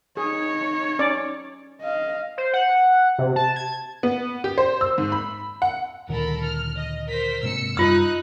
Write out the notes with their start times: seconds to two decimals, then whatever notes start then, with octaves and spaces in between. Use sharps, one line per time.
0.17 D#4 G#4 C#5
0.99 C#4 D5
1.81 D#5 F5
2.38 C5
2.54 F#5
3.19 C3
3.36 A5
3.56 G#6
4.03 B3
4.44 G4
4.58 C5
4.81 E6
4.98 G#2
5.12 B5
5.62 F#5
6.09 D2 A#2 D#3 A4 A#4 B5
6.44 F6
6.75 D#5
7.07 A#4 C5 B6
7.43 G#2 C3 A#3 E6 C#7
7.77 F#2 G3 D#4 F4 E6 F#6